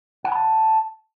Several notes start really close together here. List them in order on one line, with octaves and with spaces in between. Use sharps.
F#5 G#5 B5 A5